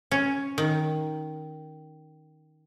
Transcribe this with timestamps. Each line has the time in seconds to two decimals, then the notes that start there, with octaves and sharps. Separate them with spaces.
0.11 C#4
0.58 D#3